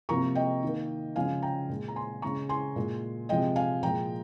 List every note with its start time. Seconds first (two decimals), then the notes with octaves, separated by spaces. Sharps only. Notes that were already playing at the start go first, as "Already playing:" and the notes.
0.09 C3 F3 A#3 A#5 C#6
0.35 D#5 G5
0.63 D#3 A#3
1.16 C#3 F3 G#3 F5 G#5
1.42 G5 A#5
1.69 A#2 G#3
1.88 A#5
1.96 G#5 C6
2.22 C#3 G#3 A#5 C#6
2.49 G#5 C6
2.76 A#2 G#3
3.29 C3 F3 G#3 D#5 G5
3.56 F5 G#5
3.83 A#2 F3 G#3 G5 A#5